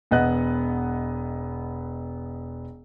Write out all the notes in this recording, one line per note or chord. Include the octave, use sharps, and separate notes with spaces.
E1 B3 D#5 F#5 F#6